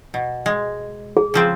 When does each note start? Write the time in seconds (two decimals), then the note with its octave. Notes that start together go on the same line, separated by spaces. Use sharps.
0.14 B2
0.46 G#3
1.17 G#4
1.34 C#3 F3 C4